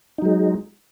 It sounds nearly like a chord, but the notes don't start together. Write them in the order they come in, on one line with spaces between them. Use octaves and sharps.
D#4 F#3 G#3